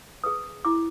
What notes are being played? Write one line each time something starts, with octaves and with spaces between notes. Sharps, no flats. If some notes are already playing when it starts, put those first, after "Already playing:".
G#4 B4 D#6
E4 D6